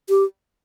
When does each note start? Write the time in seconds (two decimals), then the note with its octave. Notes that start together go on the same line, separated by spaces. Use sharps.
0.09 G4